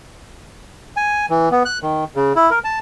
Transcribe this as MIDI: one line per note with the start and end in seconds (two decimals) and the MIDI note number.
0.97 1.26 80
1.30 1.49 52
1.52 1.63 59
1.65 1.78 90
1.82 2.04 51
2.16 2.33 49
2.36 2.50 64
2.51 2.59 70
2.64 2.79 81